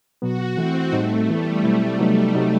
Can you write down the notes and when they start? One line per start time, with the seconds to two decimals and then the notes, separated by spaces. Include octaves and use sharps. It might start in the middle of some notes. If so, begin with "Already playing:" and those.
0.22 B2 F#3 B3 F#4
0.57 E3 A3 C4 E4
0.93 A2 G3 A3 C4 D#4
1.28 E3 G3 B3 E4
1.64 B2 F#3 A3 C4 E4
1.99 C3 F#3 B3 D#4
2.35 C3 F#3 A3 D#4